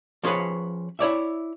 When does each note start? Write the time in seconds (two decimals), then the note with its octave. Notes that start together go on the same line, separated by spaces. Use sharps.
0.23 F3 C#4 G#4 B4 C#5
0.99 E4 C#5 D5 E5